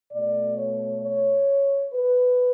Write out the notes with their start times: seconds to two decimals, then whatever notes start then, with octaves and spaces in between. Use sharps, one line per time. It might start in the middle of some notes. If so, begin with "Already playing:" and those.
0.12 B2 A3 D5
0.57 C#5
1.02 C#5
1.94 B4